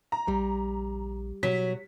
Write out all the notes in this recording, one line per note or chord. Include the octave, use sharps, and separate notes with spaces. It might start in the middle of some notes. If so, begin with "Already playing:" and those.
A#5
A#1 G3
B2 F#3 B6